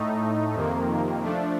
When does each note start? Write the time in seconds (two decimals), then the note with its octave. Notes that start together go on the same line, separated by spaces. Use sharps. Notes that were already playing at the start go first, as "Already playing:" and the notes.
Already playing: A2 A3 D#4
0.54 F2 C3 D#3 A#3
1.23 F3 A3 D4